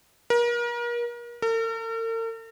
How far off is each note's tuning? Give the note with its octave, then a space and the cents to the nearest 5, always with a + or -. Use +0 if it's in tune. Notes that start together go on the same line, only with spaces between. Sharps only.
A#4 +35
A#4 -45